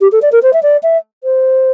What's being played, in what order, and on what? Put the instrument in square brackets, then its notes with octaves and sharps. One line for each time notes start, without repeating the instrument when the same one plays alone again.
[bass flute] G4
A4
D5
A#4
C5
E5
D5
E5
C5